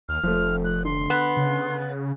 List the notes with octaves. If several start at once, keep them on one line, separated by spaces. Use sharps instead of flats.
D#2 F6
F1 F3 A3
F#6
D3 C6
B3
C#3